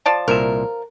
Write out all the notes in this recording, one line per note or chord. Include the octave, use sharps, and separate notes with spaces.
F3 D5 A5
C2 A#2 A#4 E5